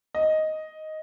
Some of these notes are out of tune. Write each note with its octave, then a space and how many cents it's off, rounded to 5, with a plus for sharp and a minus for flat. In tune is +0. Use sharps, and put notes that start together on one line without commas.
D#5 +5